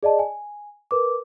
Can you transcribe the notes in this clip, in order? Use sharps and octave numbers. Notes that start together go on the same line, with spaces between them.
G#4 D5 D#5 A5
G#5
A#4 B4 D6